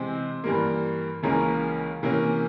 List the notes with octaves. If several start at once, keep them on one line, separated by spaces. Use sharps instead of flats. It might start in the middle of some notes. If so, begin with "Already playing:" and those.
Already playing: C3 E3 G#3 C4 C6
G2 E3 G3 A#3
C#2 C#3 E3 A#3 C#4 A#5
C3 E3 A#3 C#4